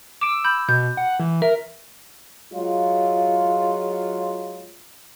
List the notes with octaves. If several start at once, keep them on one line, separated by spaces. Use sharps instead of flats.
D6 E6 D7
B5 G6
B2 G6
F#5
E3
A#4 E5
F#3 G#3 F4